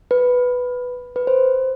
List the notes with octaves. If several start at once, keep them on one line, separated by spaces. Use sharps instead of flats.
B4
B4
C5